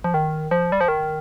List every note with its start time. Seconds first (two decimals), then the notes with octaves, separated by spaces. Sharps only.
0.04 F3
0.14 D#3
0.51 F3
0.72 G3
0.81 F3
0.88 D#3